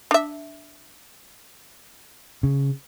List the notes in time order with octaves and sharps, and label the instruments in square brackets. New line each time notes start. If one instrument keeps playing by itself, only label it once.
[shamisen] D4 E5
[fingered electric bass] C#3